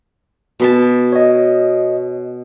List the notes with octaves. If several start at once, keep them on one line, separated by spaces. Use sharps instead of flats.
B2 B4 A5
C#5 D#5